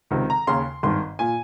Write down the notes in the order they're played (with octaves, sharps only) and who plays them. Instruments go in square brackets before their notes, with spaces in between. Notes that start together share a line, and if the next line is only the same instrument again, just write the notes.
[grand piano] C#2 C3 D#3
A#5
D#2 C#3 C6
G#1 G2 D#3 C6
A#2 G#5